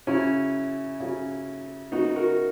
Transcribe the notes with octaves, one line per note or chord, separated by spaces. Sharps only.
C#3 F#3 C#4 E4
C#3 F#3 C#4
C#3 F#3 B3 D#4 F#4
F#4 A#4